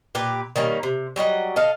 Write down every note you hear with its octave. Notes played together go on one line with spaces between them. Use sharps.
A#2 G4 B4
D#3 G3 A#3 C#4
C3
F#3 G3 D#5 F#5
A4 D#5 F5